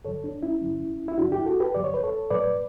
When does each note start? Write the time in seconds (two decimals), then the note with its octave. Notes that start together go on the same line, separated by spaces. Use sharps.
0.05 G2 D3 F#3 A4 C#5
0.24 D4
0.43 C#4 E4
0.61 G2 D3 F#3
1.08 E4
1.18 G2 D3 F#3 D4 F#4
1.32 E4 G4
1.46 F#4 A4
1.60 G4 B4
1.75 G2 D3 F#3 D5
1.84 C#5
1.94 B4
2.03 A4 C#5
2.30 A2 F#3 B4 D5